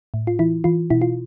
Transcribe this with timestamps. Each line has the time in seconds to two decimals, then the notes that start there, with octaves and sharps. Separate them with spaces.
0.14 A2
0.27 F4
0.39 E3 E4
0.64 E3 F4
0.90 B2 E4
1.02 F4